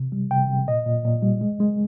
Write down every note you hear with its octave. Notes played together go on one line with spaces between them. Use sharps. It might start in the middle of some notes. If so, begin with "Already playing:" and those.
Already playing: C3
G3
C3 G5
C3
A#2 D#5
A#2
A#2
G3
G#3
G#3